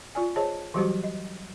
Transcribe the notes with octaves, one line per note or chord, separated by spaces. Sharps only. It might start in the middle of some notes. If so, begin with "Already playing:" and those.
F4 D5 G#5
G#4 C5 C#5 D#5 A5
E3 F#3 G3 F#4 G4 C5
D#5